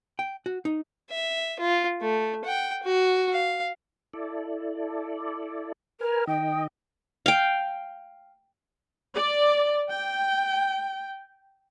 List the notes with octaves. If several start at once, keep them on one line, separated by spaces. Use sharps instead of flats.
G5
F#4
D#4
E5
F4
A3
F#5 G5
F#4
F5
E4 A4 D5
A#4 B4 G#5 F6
D#3 D#5 G5
F5 G5
D5
G5